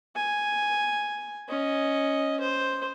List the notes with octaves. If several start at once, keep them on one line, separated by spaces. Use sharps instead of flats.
G#5
C#4 D#5
C5